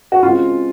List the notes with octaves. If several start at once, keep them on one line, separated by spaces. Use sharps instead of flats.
F#4
C#3 G#3 C4 F4